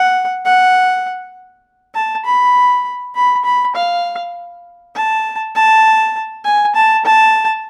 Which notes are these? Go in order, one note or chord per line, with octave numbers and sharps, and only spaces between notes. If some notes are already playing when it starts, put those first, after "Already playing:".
Already playing: F#5
F#5
A5
B5
B5
B5
F5
A5
A5
G#5
A5
A5